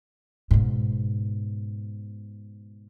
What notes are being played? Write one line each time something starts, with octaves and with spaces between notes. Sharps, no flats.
G#2 B2